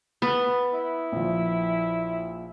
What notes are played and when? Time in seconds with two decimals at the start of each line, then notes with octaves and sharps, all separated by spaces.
0.22 B3 F6 A6 B6
0.74 E4
1.12 A#1 F3